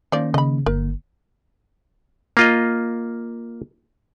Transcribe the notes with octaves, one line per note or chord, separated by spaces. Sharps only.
D#3 F3 A#3 C#4 D5
C#3 D#5 B5
G1 D3 A#3 A#4
A#3 F4 D#5